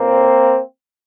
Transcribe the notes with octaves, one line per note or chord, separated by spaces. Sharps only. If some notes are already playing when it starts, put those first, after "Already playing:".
Already playing: B1 A#2 A#3 C4